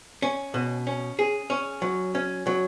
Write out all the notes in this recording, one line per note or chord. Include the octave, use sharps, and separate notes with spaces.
C#4
B2
C#4
G#4
C#4
F#3
C#4
F#3